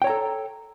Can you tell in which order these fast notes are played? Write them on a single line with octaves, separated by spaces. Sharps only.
G5 C#5 A#5 A4